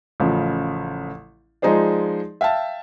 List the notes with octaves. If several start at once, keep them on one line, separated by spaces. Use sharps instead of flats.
A1 C#3 F3
F3 G#3 D#4 G#4 C5 D5
E5 F5 G5 A5